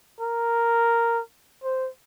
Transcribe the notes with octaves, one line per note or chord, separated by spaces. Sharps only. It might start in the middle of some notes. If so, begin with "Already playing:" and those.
A#4
C5